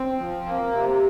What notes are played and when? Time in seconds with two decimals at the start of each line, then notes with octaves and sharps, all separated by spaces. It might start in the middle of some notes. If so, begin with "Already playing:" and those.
Already playing: C4
0.19 F3
0.46 A#3
0.72 C3